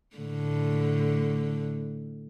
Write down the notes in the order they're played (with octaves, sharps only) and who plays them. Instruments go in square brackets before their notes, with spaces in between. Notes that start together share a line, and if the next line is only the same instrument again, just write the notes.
[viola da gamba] A2 D3